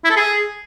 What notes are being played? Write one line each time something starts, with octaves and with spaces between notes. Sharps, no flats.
E4
A4
G#4